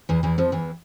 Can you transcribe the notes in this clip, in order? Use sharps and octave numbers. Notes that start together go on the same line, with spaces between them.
E2 E3
E2 E3
F2 F3
E2 E3